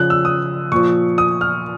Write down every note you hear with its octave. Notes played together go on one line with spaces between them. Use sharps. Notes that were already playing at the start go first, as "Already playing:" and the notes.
Already playing: C#3 F3 F#6
E6
D#6
A#2 F3 C#6
D#6
F6